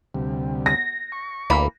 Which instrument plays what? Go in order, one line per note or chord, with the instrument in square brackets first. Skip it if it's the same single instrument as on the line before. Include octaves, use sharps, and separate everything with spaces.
[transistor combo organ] D2 C3 G3
[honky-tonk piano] A#6
[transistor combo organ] C#6
[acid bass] D2 [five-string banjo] E3 A#3 B5